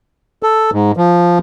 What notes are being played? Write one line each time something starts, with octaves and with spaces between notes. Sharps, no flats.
A4
G#2
F3